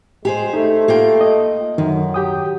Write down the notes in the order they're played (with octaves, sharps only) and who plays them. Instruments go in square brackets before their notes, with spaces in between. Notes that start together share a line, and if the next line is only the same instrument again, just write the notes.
[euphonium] G#3 [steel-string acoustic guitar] G4 G#4 C5
[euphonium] A3 [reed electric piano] D#4
[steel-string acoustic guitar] A#3 F4 G5
[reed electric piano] D#5
[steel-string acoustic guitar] F#2 [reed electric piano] D#3 [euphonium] F#3
[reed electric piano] G4 G5 D#6